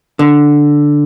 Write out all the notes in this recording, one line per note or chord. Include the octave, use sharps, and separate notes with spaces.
D3